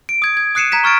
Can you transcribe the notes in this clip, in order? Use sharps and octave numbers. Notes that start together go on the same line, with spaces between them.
D7
D#6 G#6 D7
G#6
D#6 F#6 C7 C#7 D#7 E7
A#5 G#6 B6 E7
C#6 F6 A6 D7